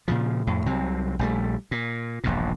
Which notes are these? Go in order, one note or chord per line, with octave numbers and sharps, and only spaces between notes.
A#2 C#3 F3
F2 A2
C2 C3 F#3 C4
A#1 G3 A3
A#2
E1 A#1 G2 A#2